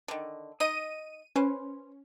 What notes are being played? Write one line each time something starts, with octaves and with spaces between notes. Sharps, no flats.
D3 D#3
D#4 D#5 D#7
C#4 B4 C5